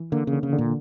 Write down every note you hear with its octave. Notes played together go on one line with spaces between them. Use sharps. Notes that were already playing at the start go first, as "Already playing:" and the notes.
Already playing: E3
D3 A#3
C#3
D3
C#3
D3
A#2